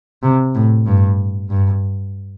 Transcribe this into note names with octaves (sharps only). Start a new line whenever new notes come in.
C3
A2
G2
G2